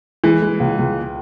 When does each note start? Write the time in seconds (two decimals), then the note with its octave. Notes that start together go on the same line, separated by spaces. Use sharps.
0.24 E3 G#3
0.42 G#3
0.60 C#2
0.79 C#2